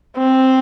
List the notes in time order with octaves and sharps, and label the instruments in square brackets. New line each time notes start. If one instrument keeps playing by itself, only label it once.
[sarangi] C4